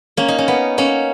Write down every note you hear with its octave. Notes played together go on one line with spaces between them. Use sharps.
A#3 C#4
D#4
C#4
B3
A#3 C#4